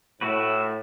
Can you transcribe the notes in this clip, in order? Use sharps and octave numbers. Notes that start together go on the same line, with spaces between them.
A2 E4 F#4 B4